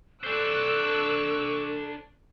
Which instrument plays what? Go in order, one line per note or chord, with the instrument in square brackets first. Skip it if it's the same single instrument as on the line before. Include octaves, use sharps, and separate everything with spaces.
[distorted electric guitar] D4 C5 [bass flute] A4 [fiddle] C#6 D6 [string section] E6 F#6